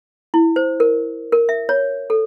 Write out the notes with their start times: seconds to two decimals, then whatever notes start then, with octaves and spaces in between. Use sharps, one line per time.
0.34 E4
0.56 C5
0.80 A#4
1.32 A#4
1.49 E5
1.69 C#5
2.10 A4